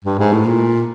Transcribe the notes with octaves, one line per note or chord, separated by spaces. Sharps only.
G2
G#2
A2
A#2